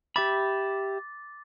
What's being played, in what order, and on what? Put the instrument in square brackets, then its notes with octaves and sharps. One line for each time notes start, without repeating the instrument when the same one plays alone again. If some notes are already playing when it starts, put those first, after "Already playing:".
[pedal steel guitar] G4 E5 B5 [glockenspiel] D6 A6